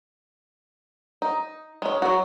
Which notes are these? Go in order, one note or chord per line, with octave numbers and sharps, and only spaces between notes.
D#4
G#3 C#4
F#3 F#4